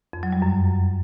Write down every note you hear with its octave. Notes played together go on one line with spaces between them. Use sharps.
F2
F#3
G3
F#2